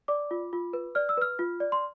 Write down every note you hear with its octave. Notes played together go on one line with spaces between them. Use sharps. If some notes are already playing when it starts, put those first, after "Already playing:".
D5 D6
F4
F4
B4
D5 F6
E6
B4 F6
F4
D5
C6